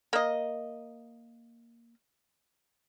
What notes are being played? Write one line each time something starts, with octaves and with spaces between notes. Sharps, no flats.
A#3 D#5